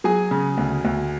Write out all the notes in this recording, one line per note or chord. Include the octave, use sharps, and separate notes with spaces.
F#3 G#4 G#5
C#3
D2
D2